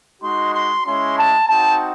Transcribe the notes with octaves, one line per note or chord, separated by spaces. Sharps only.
G#3 D#4 F#4 C6
C6
G#3 C#4 E4 C6
A5
C4 D#4 F#4 A5